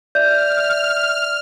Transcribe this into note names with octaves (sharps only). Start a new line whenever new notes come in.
D5 E5 F6 G6